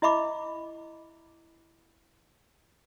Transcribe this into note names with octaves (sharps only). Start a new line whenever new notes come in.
E4 D#5 E5 B5 D6